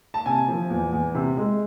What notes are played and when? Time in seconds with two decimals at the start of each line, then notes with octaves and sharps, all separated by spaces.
0.14 A5
0.26 C3 G#5
0.48 F3
0.70 E2
0.93 E2
1.15 C3
1.37 G#3